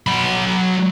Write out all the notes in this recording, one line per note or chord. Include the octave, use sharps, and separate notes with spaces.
F#3 B5